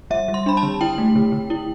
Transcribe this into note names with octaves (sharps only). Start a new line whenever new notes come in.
G3 E5
G3
C6
D4 B5
A5
D3
E4 G5
A3
D3
D3
E4